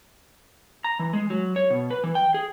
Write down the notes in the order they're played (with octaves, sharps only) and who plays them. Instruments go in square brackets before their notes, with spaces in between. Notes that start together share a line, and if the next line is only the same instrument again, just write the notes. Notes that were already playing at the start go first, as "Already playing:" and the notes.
[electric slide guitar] A#5
E3
G#3
F#3
C#5
B2
B4
E3
G5
G#4